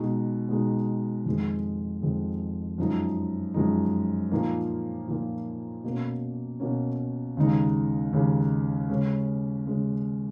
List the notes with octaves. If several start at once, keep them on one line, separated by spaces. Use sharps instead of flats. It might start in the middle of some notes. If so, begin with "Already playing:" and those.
Already playing: B2 G#3 D#4
B2 G#3 D#4
F2 D#3 G#3
F2 D#3 G#3
F#2 F3 G#3 D#4
F#2 F3 G#3 D#4
A#2 F3 A#3 D#4
A#2 F3 A#3 D#4
B2 A#3 C#4
B2 A#3 C#4
D#2 C#3 G#3 D#4
D#2 C#3 G#3 D#4
C#3 G#3 C#4
C#3 G#3 C#4